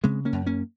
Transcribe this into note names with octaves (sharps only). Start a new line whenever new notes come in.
C#3 G#3 C4
A#3 C#4
F#2
A#3 C#4